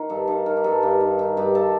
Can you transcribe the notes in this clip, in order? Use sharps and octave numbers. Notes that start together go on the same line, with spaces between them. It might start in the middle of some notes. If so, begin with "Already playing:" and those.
Already playing: D#3
G2 A4
D#3 A4
D#3 A#4
G4
G2 A4
G2
D#3
D#3
G2 G4
A4